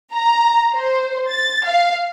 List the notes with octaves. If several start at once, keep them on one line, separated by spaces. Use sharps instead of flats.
A#5
C5
A6
F5